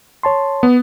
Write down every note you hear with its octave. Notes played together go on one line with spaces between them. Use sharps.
C#5 A5 C6
B3